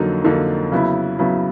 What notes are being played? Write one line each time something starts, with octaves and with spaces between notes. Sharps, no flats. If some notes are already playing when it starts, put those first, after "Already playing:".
Already playing: F2 D3 F#3 A#3 D#4
F2 D3 F#3 A#3 D#4
C#3 F#3 B3 E4
C#3 F#3 B3 E4